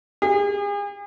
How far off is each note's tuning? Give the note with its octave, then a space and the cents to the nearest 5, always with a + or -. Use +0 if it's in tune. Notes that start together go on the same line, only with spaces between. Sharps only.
G#4 -40